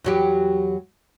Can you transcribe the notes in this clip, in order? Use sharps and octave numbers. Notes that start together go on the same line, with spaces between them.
E2 F#3 G4